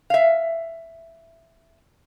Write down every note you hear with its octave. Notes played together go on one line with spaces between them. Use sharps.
E5 F5